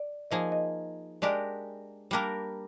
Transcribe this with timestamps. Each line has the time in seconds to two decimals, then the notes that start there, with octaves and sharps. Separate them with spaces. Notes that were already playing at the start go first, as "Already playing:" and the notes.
Already playing: D5
0.31 F3 A#3 D#4 G#4 D#5
0.52 D#5
1.22 G#3 D4 G4 A#4 D5
2.11 G3 A#3 D4 G4 A#4